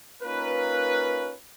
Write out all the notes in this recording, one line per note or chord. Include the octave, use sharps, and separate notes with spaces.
A#3 C#4 D#4 F4 A#4 B4